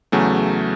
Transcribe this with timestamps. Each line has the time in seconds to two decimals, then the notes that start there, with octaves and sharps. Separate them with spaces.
0.12 E2 C#3 F#3 A3